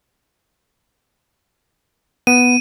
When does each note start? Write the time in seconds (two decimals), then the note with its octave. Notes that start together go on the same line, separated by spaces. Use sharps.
2.27 B3 D#7